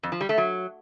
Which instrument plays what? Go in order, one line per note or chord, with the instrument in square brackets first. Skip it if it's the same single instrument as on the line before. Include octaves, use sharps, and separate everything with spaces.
[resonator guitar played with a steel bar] F2
F3
G3
A3
F#3